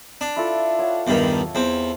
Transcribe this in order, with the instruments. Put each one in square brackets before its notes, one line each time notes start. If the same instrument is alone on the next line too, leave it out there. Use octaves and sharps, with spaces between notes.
[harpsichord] D4
[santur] E4 F4 A4
C#5 F5 F#5
[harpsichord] E2 G2 D#3
E2 C4